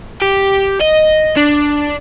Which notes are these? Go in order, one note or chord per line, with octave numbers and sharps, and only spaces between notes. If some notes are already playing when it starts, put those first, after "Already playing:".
G4
D#5
D4